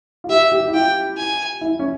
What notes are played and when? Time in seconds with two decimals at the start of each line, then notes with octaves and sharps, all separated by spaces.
0.24 F4
0.29 G4 E5
0.52 G4
0.68 E4
0.74 F4 G5
1.17 G#5
1.61 E4
1.79 C#4